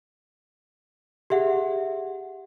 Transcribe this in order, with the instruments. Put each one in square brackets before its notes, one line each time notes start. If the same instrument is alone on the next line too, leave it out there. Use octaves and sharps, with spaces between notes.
[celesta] G4 G#4 E5 F#5